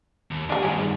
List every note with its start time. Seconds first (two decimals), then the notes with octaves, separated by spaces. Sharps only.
0.31 D#2
0.50 D4 D#4 G4 G#4
0.63 G2 D#3 C#4 G#4